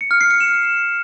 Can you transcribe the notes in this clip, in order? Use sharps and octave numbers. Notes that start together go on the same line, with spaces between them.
C#7
F6
C7
C#7
E7